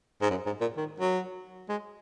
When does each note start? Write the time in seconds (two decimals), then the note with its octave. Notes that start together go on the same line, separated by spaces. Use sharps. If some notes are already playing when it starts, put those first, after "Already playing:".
0.22 G#2
0.30 F#2
0.46 G#2
0.61 A#2
0.77 D#3
1.00 F#3
1.69 G#3